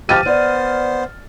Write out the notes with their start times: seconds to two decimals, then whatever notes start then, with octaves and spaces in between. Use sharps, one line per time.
0.09 F3 G4 F6 A6 D#7
0.26 B3 C5 D5